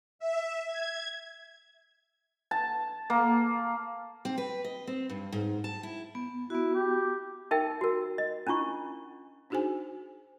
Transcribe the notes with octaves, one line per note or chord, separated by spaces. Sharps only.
E5
G#6
A5
A#3
C4
B4
D#5
C4
G2
G#2
A5
E4
B3
B3 E4 F#4
G4
D#4 A#4 E5 G5
F#4 A#4
D#5
C#4 D4 E4 F4 C#6
D4 D#4 F#4 G#4 C5 G#5